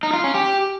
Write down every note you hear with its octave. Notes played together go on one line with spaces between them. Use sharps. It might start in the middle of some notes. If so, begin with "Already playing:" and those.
D#4
F4
C#4
G4